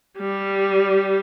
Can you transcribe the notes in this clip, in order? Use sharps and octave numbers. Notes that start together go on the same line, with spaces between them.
G3